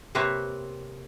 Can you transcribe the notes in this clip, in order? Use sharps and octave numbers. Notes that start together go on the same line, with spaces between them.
C3 A#3 C4 B4 C#5